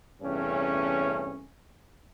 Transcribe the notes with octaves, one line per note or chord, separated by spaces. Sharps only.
E2 G2 C3 A3 C#4